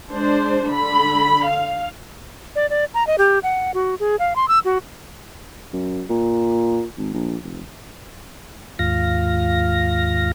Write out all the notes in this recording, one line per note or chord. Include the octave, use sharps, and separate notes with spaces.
G#3 D4 C5
D3 B5
F5
D5
D5
A#5
D#5
G4
F#5
F#4
G#4
F5
C6
E6
F#4
F#2
A#2
G#1
A#1
F1
D#2 G#2 F4 F5 A#6